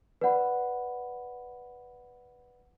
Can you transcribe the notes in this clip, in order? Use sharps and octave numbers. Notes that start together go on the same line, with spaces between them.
B4 D5 F#5 B5